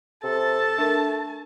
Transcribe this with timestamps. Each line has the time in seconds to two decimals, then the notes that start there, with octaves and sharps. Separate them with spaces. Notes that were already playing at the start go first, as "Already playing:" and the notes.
0.24 C3 A4 A5
0.78 A3 D4 A#4